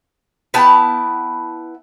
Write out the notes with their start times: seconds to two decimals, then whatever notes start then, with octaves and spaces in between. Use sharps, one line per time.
0.54 B3 E4 G5 A5